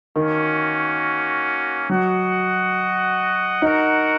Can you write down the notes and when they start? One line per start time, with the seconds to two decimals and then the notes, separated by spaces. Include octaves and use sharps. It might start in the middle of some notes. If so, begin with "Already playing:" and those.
0.16 D#3 A#3 C#4 F#4
1.89 F#3 F#4 D#5 F#5
3.62 D#4 F#4 A#4 F#5